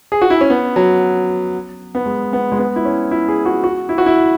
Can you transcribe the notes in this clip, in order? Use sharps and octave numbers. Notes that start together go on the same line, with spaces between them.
G#4
F#4
E4
C#4
B3
F#3
B3
G#3
B3
G#3
B3
E4
C#4
E4
G#4
F#4
F#4
E4
F#4
E4